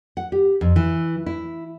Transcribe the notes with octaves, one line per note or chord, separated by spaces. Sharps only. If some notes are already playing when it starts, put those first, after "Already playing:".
F#5
G4
F2
E3
E4